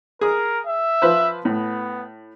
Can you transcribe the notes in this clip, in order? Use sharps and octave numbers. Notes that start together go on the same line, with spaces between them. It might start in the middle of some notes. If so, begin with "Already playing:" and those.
G#4 A#4 D#6
E5
F3 B4 C5
A2 B3